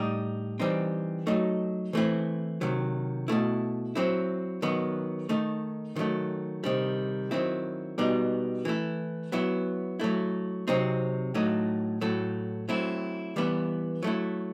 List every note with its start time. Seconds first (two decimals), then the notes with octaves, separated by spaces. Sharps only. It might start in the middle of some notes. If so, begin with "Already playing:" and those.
Already playing: A2 G3 D#4
0.59 E3 G3 C4 D#4
1.27 F#3 A3 D#4
1.93 E3 A3 C4 E4
2.61 C3 D#3 F#3
3.28 B2 A3 E4
3.95 F#3 C4 E4
4.62 D#3 F#3 B3
5.29 D#3 A3 D#4
5.96 D#3 F#3 A3
6.64 C3 D#3 G3
7.31 D#3 F#3 C4 E4
7.98 B2 G3 B3 D#4
8.65 E3 A3 E4
9.32 F#3 B3 E4
10.00 F#3 A3 E4
10.68 C3 F#3 C4 D#4
11.35 A2 F#3 A3 D#4
12.01 A2 F#3 A3 E4
12.69 F#3 A3 C4 E4
13.36 E3 G3 B3 E4
14.03 F#3 A3 E4